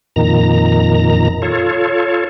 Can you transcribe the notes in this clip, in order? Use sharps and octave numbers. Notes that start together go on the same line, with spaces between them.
F2 A#2 D#3 A#5
F4 A4 C#5